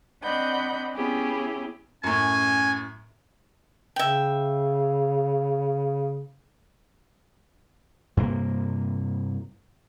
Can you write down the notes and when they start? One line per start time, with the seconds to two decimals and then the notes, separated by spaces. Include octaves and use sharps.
0.23 C4 D4 D#5 F#5 B5 G6
0.94 B3 C#4 E4 G4 G#4
2.03 F#2 A2 C#4 G#5
3.96 C#3 E5 G5
8.17 G2 C3 A#3